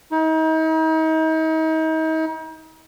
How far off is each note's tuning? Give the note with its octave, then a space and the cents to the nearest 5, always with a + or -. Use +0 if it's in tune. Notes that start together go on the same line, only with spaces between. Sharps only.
D#4 +40